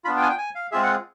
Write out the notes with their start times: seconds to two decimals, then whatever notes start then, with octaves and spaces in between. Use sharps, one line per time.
0.05 B3 D4 F4 B5
0.17 G5
0.22 G#5
0.29 G5
0.38 G#5
0.55 F5
0.72 G#3 C4 F4 G#4 E5
0.83 F#5